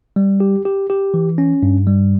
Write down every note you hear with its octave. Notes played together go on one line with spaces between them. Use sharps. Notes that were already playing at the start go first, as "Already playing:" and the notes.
G3
G4
G4
G4
E3
C#4
G2
G3